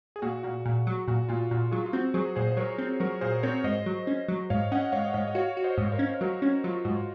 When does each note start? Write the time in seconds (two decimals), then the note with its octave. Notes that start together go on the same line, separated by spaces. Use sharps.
0.16 G#4
0.22 A#2 F#4
0.43 A#2 F#4
0.66 A#2
0.87 F#3
1.08 A#2 F#4
1.29 A#2 F4
1.51 A#2 F#4
1.71 F#3 F4 G#4
1.86 F4
1.93 C4 F#4
2.14 F#3 G#4 C5
2.36 A#2 G#4 C5
2.52 C5
2.57 F#3 A#4 C#5
2.78 C4
3.00 F#3 F#4 A#4
3.21 A#2 G#4 C5
3.43 C4 A#4 C#5
3.64 G#2 C5 D#5
3.86 F#3
4.07 C#4
4.28 F#3
4.50 G#2 C#5 F5
4.72 C#4 D#5 F#5
4.92 G#2 C#5 F5
5.05 D#5
5.13 G#2 C#5 F5
5.28 D#5
5.35 F#4 C#5 F5
5.57 F#4
5.64 C5 D#5
5.78 G#2
5.92 A#4 C#5
5.99 C#4
6.21 F#3 F#4 A#4
6.42 C#4 F#4
6.64 F#3 F4
6.85 G#2 F#4